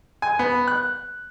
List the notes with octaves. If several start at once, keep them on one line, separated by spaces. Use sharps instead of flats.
G#5
B3
F#6